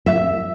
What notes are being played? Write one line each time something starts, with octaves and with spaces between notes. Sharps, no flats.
E5